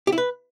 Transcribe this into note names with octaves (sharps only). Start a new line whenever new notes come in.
G4
E4
B4